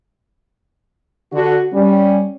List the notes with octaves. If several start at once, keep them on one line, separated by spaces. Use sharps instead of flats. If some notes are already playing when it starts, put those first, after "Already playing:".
D3 F#4
G3 C#4